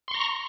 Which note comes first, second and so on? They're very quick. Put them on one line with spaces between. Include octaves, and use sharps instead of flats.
C6 C#6 A#5